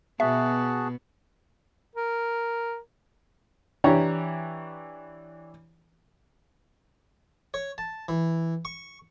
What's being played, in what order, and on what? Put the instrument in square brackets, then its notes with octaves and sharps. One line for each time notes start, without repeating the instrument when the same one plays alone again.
[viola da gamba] B2 B3 [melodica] F#4 G#4 A5 [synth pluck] E5
[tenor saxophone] A#4
[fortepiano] E3 D4 G4 C#5 A#5
[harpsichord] C#5
A5
E3
C#6